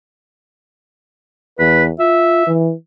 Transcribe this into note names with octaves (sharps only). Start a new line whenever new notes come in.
E2 B4
F4 E5
E3